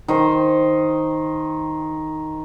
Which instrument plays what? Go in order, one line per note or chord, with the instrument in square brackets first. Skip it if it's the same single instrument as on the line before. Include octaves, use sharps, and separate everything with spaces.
[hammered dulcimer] D#3 D#4 C5